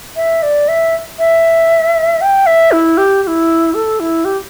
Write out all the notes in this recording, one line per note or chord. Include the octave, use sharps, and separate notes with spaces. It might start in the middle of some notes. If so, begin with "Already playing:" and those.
E5
D5
E5
E5
G5
E5
E4
G4
G4
E4
A4
E4
G4